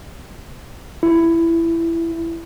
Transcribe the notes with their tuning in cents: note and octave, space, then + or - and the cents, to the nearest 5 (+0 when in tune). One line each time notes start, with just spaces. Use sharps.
E4 +15